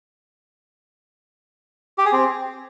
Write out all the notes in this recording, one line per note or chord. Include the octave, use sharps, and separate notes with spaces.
G4
G#4
C4